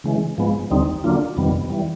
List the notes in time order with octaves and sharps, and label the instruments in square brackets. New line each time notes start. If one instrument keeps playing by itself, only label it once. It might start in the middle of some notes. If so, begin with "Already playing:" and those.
[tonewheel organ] C#3 E3 G#3
G#2 F3 G#3 B3
D#2 D3 G3 C4 D#4
D3 F#3 A#3 D4 F4
F2 C3 D#3 G3 B3
E3 G3